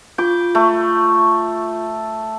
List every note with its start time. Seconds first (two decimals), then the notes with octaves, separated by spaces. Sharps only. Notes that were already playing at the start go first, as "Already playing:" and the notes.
0.18 F4 D6 G6
0.55 A3